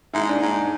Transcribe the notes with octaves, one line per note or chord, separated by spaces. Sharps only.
G#2 E4
D#4
D4
D#4
G#2